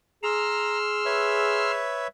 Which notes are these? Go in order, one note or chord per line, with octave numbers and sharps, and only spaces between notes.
G#4 A#5 C6 E6 F6
B4 C#5 E5